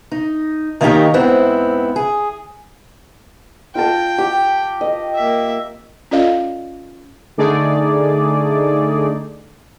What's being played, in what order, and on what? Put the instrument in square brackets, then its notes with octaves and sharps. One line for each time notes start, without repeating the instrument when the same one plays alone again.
[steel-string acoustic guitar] D#4
D#3 A#3 C#4 D#4 G4 A#5
G#2 B3 C4 E4
G#4
[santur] F4 A#4 A5 [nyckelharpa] G5
[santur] G4
D#5
[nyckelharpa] A#3 E5
[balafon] C#4 F4 A4 D5 D#5 F5
[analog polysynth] D3 A3 D#4 G#4 D5